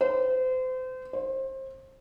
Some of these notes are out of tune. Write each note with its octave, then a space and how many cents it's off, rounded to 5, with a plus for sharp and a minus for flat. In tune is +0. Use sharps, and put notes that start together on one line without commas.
C5 -30
C5 +30